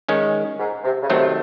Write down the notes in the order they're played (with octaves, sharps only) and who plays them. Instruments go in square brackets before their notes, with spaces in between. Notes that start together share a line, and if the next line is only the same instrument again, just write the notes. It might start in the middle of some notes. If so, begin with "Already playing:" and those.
[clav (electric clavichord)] D#3 G#3 C#4
[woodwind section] G#2
C3
C#3
[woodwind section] C3 [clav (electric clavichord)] D#3 F#3 A3 C4